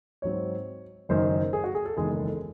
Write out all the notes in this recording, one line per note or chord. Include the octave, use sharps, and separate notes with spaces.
G#2 F#3 C4 C#5
F#1 F#2 D#3 C5
G#4
F#4
G#4
A4
F#1 E2 D#3 G#3 G#4
A4
A4